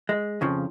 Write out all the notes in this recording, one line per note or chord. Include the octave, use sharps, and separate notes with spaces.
G#3
F2 C#3 F3